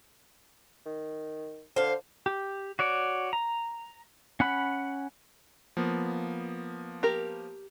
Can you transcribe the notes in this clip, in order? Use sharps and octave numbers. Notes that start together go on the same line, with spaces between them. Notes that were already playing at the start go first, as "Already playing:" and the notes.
D#3
D3 C5 F5
G4
F#4 C#5 D5
A#5
C#4 F#5 B5
F3 A#3 B3
G4 A#4